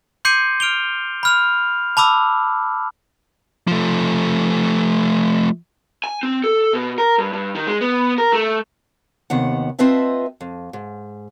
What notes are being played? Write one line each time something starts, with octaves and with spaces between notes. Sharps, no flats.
C6 D6 G6 C7 C#7 D#7
F6 D7 F7 G7
B5 F6 F7
A5 B5 D6 E6
F3 A3
G#5
C4
A4
B2
A#4
G2
G2
D#3
G#3
B3
A#4
A3
D#2 C3 D#3 B3 F#5
C4 F4 B4 D#5 E5 A5
F2
G#2